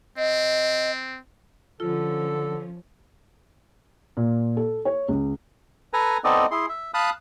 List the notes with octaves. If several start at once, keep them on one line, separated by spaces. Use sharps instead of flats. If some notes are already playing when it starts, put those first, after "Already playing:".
C4 D#5
D3 F3 C#4 F4 A4
A#2
A4
C#5
C#2
A4 B4 G#5 A#5
B3 C4 D#4 A4 D5 D#5
E4 G#4 C6
E5
F5 A5 B5 D#6 F#6